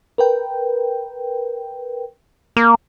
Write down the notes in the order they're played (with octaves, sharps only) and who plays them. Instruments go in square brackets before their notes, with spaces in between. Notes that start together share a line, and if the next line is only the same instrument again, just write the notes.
[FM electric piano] A#4 B4 G5
[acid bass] A#3